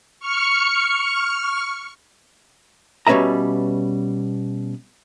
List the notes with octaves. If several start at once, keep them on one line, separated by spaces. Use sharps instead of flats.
C#6 F6 C#7
B2 G3 C#4 B4 E5 A#5